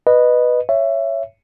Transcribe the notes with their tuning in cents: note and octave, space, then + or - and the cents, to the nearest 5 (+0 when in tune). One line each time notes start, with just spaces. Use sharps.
B4 -5 D#5 -15
C#5 +0 E5 +20